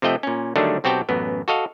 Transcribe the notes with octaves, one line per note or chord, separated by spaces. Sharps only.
C3 F3 A3 D#5 G5
A#2 C#4
D3 D#3 F#3 G3 A3 D4
B1 C4 F#4 G4 G5 A5
A1 F#2 B3
F#4 A4 D#5 F5